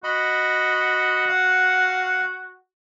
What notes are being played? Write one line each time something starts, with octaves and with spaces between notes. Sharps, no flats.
F#4 D#5 B5
F5 F#5